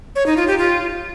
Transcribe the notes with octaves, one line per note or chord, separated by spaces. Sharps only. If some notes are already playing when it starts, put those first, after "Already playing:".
C#5
D#4
F4
G4
F4